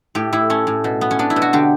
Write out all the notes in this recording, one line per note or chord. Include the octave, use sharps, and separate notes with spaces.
A2 G4
A2 E4
A3 C#4
A2
B2
B3
C#4
B3 D4
E4
B2
F#4
D3 G4